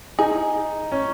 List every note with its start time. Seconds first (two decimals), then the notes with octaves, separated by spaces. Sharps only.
0.19 D#4 G#4
0.92 C#4